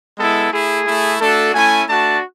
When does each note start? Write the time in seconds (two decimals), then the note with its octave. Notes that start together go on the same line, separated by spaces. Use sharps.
0.18 G#3 B3 E4 A4
0.52 A3 E4 G#4
0.86 A3 E4
1.20 A3 D4 F#4 A4
1.54 A3 C#4 E4 G#5
1.88 A3 D4 F#4 A5